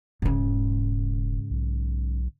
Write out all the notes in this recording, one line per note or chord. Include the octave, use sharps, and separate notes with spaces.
E1 G#2 C#3
B1